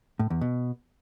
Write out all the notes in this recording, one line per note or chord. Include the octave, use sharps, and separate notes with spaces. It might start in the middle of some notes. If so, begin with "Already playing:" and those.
A2
E2
B2